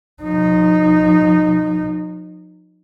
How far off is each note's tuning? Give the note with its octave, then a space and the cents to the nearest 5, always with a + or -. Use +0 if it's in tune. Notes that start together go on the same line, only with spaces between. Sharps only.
F3 +40 D#4 -20